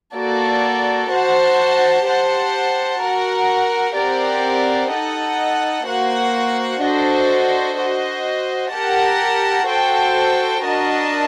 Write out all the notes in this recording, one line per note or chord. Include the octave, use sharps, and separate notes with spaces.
A#3 F#4 A4 D5
F#4 C5 F#5 A5
G4 C5 F#5 A5
F#4 A#4 F#5
C4 G4 A#4 D5 F#5
D#4 A4 D#5 F#5
A#3 F#4 C5 F#5
D4 F#4 A4 C5 D#5
F#4 C5 D#5
G4 A#4 F#5 A5
F#4 A4 C5 G5
D4 F#4 A#4 D#5 A5